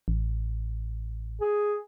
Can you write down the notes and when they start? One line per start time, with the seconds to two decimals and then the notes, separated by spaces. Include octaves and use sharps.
0.08 A1
1.41 G#4